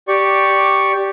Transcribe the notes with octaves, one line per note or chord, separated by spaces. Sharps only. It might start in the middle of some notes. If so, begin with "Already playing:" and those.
G4 D5 C#6